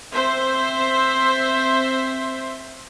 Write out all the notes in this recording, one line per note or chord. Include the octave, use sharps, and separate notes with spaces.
C4 C5 E5